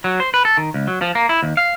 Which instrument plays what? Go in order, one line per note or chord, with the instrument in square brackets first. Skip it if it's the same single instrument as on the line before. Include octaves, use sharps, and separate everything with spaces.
[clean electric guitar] F#3
C5
B4
A4
D#3
C#2
F#3
F3
A#3
E4
D#2
F5